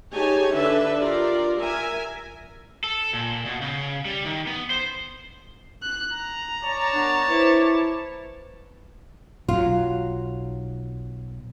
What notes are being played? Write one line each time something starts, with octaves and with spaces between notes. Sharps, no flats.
D#4 G4 G#4 C#5 G#5 A5
D3 D4 A4 B4 E5
F4 G4 A#4 D5
A#4 E5 G#5
A4
A#2
B2
C#3
G3
D#3
B3
C5
F#6
A#5
C#5 D5 A5
A#3 B3 D4
E4 B4 C5
B1 F#3 F4